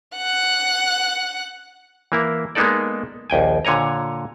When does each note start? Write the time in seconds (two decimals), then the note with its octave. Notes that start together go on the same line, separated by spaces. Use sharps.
0.17 F#5 F#6
2.12 E3 A#3 E4
2.55 G#3 A#3 B3 D#4 A4 D5
3.30 A#1 D#2 G5 G#5
3.65 A#2 D3 C#5 G#5 A#5